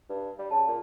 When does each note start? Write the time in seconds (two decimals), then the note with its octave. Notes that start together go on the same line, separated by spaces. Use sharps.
0.09 G2
0.39 G3
0.51 C#3 A5
0.68 A#2